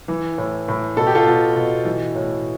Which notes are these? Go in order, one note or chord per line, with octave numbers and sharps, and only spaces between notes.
E3
A2
A2
B2 A4
G4
F4 A4
B2
B2
E3
A2